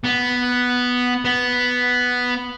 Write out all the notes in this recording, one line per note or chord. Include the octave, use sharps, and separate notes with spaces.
B3
B3